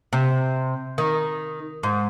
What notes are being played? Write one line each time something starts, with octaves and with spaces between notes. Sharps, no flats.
C3
D#3
G#2